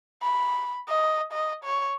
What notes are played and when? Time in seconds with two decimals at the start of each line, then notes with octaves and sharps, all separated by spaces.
0.22 B5
0.89 D#5
1.33 D#5
1.64 C#5